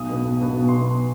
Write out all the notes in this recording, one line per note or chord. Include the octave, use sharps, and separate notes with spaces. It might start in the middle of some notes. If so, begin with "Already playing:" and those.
Already playing: B1 D#6
B2 B3
B1
B2 B3
B1
C6
B2 B3